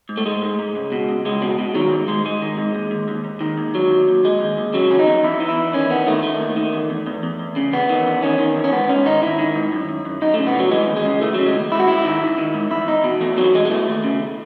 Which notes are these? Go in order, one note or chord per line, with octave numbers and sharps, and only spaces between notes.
G#2
A3
G#2 G#3
G#2
G#2
C#2
B2
C#2
C#2 G#3
B2
B2
D#3 F#3
G#2
G#2 G#3
G#2 G#3
D#3
G#2
D#2
D#2
D#2
D#2
D#3
D#2
D#2 F#3
D#2
D#2
D#2 G#3
D#2
D#2
C#3 F#3
E2 C#4
D#4
E2
E2 E4
E3
E4
E2
D#3 C#4
D#3 B3
D#3 A3
D#3 A3
D#2
D#3
E2
E2
E2
E2
E2
C#3
E2 B3
D#3
E2
D#3 C#4
D#3
E2
C#4
G#2 B3
G#2 C#4
D#3 D#4
D#3 E4
D#3
G#2
F#2
F#2
F#2
F#2 D#4
C#3 A3
B3
E3
F#3
E3 G#3
D#2
G#3
C#3
E3 A3
C#3 F#3
G#3
D#2
G#2 E4
F#4
G#2 E4
D#3
D#3
D#3
G#2
E2 E4
E2 D#4
B2
E2 A3
B2 F#3
B2 G#3
G#3
E3 A3
D#2
C#3